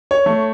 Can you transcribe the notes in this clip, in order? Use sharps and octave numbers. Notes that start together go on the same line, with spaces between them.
C#5
A3